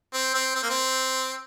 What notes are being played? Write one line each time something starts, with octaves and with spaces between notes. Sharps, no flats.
C4
C4
C4
A#3
C4